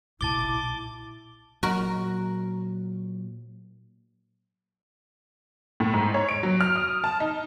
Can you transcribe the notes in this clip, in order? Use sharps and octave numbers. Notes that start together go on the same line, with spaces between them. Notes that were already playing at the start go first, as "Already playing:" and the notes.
B1 A#2 E4 A5 D6 A6 G7
A#2 F#3 F#4 A#4
A2
G#2
C#5
D7
F#3
F6
D#6
A5
D#4